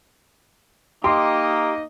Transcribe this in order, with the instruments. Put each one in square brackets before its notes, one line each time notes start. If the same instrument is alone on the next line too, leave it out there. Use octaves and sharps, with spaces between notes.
[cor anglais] A#3 [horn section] D#4 D#5 [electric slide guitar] G4 [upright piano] C6